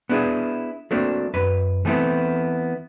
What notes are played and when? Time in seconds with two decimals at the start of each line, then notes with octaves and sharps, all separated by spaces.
0.09 B3 D4 E4 G#4
0.91 F#3 A3 A#3 C4 D4
1.34 F#2 B4
1.85 E3 A3 B3 C4 E4